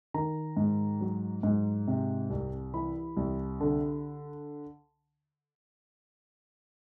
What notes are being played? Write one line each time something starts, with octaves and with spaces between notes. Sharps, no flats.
D#3 A#5
G#2
F#3
G#2
C3
C2
E3 B5
C2
D3